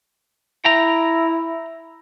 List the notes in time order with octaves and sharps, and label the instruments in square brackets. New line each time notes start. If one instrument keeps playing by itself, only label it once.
[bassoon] E4 [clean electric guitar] G5 A#5